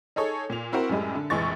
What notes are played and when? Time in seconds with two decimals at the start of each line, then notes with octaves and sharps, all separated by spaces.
0.16 D#4 G#4 A4 C#5
0.50 A#2 F7
0.72 C4 E4 F#4 A#4 C5
0.89 F#2 A2 G3 G#3
1.15 D3
1.30 F1 A#1 E3 G#3 C#6 A6